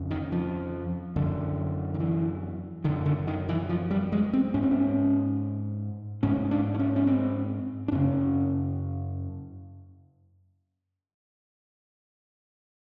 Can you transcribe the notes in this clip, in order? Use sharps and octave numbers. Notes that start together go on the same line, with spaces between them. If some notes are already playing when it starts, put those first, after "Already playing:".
Already playing: F2 C#3
D#3
F3
F#2 D3
D#3
E3
F#2 D3 D#3
D3
D#3
E3
F3
G3
G#3
C4
G#2 C#4
C4
C#4
G#2 C#4
D4
D4
C#4
C#4
C4
D4
F#2 C#3 C#4